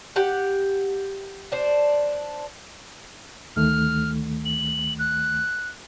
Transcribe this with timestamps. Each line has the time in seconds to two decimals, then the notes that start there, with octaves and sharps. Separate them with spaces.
0.16 G4 F#5
1.52 D4 C5
3.56 D2 D#3 A3 F6
4.45 F#7
4.99 F#6